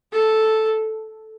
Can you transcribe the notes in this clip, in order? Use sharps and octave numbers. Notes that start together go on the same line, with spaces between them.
A4